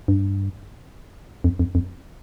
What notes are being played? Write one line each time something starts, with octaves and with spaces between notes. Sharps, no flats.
G2
F2
F2
F2